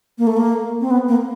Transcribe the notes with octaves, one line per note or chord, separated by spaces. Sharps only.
A#3
A3
A#3
C4
B3
A#3